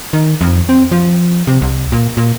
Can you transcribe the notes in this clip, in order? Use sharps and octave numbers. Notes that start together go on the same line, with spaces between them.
D#3
F2
C4
F3
C3
C2
A#2
A#2